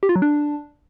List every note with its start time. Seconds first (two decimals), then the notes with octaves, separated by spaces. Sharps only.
0.03 G4
0.09 F4
0.16 F#3
0.22 D4